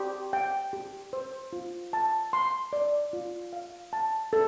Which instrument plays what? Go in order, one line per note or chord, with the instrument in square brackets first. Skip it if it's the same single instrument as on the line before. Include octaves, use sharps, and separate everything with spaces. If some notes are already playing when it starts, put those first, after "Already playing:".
Already playing: [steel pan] G4
G5
G4
C5
F4
A5
C6
D5
F4
F5
A5
A4